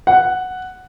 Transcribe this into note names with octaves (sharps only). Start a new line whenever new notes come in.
F#5